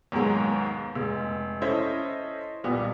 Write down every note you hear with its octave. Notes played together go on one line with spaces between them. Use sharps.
D#2 G#2 B2 F#3 G#3
F1 G#3 E6
C#4 E4 A4 C5 C#5 D#5
B1 A#2 G3 B3